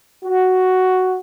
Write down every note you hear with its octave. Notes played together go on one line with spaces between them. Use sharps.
F#4